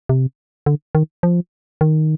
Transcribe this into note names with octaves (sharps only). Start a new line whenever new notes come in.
C3
D3
D#3
F3
D#3